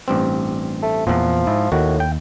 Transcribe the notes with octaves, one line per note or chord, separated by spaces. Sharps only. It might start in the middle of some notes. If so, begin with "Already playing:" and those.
A1 G2 C4
A3
E2 A#2 F3
G#2 E4
D#2 A2 D#3 F#4
G5